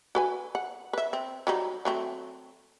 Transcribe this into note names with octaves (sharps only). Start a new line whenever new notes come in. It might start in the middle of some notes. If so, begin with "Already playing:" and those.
F#4 B4 G#5
F#5
B4 E5
C4
F#3 G3 D#4
F#3 A3 C4